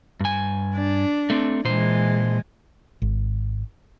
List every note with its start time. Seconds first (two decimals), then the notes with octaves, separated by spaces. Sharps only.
0.20 G2 G#5
0.75 D4
1.30 A3 C4
1.65 A#2 E3 G#3 C5
3.02 G#1